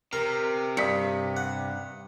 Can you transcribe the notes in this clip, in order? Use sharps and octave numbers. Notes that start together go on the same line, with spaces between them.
C3 A#4
G2 D#6 B6 C#7
F#5